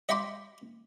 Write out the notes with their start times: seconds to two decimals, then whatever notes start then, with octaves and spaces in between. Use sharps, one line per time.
0.09 D#5 E5 G5 B5 C6 D6